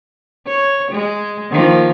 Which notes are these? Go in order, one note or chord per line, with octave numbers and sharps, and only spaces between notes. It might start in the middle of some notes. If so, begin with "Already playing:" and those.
C#5
G#3
D#3 F3 A#3